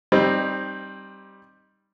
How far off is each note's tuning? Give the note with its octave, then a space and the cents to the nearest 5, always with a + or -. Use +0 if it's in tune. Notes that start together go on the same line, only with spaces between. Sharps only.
G3 +0 C4 +15 D#4 -15